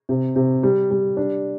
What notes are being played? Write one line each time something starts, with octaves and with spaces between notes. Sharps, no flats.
C3
C3
G3
G3
D4